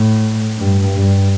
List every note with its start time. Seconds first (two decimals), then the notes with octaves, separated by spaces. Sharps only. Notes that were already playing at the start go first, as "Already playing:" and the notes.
Already playing: A2
0.58 G2
0.94 G2